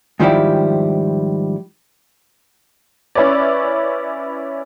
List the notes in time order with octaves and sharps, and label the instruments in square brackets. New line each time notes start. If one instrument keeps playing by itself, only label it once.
[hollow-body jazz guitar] G#2 D#3 F3 G3 E4 G4
[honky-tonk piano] C#4 E4 B4 C#5 D5